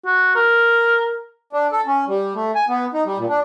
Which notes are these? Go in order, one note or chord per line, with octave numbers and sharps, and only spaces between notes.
F#4
A#4
D4
A4
C#4
G3
A3
G#5
B3
D#4
G3
A#2
D4